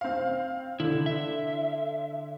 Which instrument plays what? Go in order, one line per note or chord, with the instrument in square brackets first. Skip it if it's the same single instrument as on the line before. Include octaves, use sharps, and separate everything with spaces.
[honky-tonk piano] C4 F5
[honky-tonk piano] D3 [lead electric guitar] E4
[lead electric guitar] E5